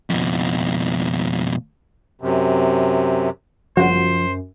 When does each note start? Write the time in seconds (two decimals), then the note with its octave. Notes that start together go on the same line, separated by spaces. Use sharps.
0.10 F2 B2
2.21 F#2 C3
3.77 G1 F#2 C#3 F3 F#4 C5